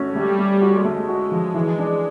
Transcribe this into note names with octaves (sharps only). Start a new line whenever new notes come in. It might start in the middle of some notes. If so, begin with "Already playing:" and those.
Already playing: A3 C#4 F#4
G3 A3
A3
F#4
G#3 A3
F#4
F3
E3
D4